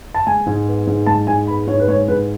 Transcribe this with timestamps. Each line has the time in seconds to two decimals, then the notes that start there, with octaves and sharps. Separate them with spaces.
0.14 A5
0.27 G#3 G#5
0.46 G#2
0.67 B3
0.87 G#2
1.06 G#3 A5
1.27 G#2 G#5
1.47 B3 B5
1.67 G#2 C#5
1.80 B4
1.88 G#3 C#5
2.08 G#2 B4